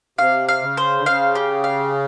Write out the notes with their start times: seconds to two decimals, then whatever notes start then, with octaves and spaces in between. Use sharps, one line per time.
0.19 C3 F5
0.48 F5
0.62 C#3
0.77 C5
0.99 D3
1.06 C#3 F5
1.35 G4
1.64 F5